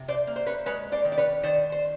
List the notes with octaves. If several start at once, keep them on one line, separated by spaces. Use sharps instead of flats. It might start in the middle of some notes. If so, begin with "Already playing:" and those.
Already playing: C3
C5 D5
A#3
C5
B4 C#5
G#3 B4 C#5
C5 D5
D#3
D5
B4 C#5
D#3 C5 D5
C5